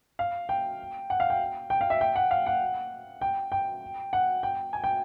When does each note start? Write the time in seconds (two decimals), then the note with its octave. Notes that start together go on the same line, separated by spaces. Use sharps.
0.19 F5
0.49 G5
1.10 F#5
1.20 F5
1.30 G5
1.70 G5
1.81 F5
1.90 E5
2.01 G5
2.16 F#5
2.31 F5
2.46 F#5
3.21 G5
3.52 G5
4.13 F#5
4.43 G5
4.73 G#5
4.84 G5